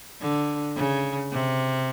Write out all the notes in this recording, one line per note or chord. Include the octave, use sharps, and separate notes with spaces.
D3
C#3
C3